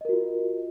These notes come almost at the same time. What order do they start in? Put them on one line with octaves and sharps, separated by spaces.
D#5 A#4 F#4 F4